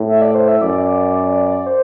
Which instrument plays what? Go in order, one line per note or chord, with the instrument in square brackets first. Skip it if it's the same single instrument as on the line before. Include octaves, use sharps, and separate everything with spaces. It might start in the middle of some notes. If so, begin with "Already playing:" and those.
Already playing: [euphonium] A2
[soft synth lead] E5
D5
C5
E5
[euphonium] F#2 [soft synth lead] D5
[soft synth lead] C5